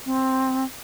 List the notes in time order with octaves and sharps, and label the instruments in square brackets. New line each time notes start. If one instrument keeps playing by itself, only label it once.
[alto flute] C4